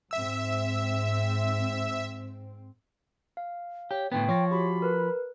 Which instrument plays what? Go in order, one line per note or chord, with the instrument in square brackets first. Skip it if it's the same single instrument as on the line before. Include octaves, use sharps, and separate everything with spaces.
[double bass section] G#2 C4 [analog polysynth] E5 E6
[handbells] F5
[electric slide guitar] G4 [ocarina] C#5
[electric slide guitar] A2 D3 B3 [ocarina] G5
[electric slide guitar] F3 [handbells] C#5 C#6 A#6
[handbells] F#4 G4 [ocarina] B5
[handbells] A#4 B4